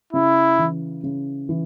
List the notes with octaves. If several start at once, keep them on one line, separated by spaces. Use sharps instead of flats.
C#3 E4
E3
C#3
E3